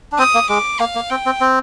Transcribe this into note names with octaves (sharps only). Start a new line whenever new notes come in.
D4
C4 D#6
A#3
G#3 D6
A#3 F5
A#3
C4 G5
C4
C4